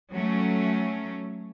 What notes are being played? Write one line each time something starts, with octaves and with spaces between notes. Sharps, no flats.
F#3 A3 C#4